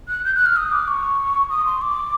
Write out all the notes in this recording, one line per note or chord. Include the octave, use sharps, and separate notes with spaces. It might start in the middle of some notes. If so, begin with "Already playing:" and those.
F#6
G6
F#6
F6
D#6
D6
C#6
D#6
C6
D6